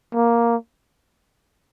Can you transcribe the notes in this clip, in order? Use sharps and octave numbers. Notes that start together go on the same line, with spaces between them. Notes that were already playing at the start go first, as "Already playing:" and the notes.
A#3